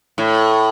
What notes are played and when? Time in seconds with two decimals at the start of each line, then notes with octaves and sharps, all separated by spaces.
0.18 A2